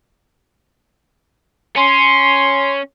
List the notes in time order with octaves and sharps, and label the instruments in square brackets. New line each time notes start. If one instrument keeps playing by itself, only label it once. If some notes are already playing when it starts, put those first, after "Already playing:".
[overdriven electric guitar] C#4 [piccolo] C6